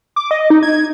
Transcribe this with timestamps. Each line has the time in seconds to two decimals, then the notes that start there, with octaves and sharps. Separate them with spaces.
0.16 D6
0.31 D#5
0.50 D#4
0.63 G#6